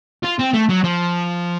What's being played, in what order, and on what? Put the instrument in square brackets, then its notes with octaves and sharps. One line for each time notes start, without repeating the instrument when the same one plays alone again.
[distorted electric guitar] F4
C4
A3
F#3
F3